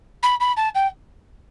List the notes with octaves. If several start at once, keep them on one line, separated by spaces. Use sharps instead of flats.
B5
B5
A5
G5